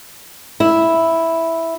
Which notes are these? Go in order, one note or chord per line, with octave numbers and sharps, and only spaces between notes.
E4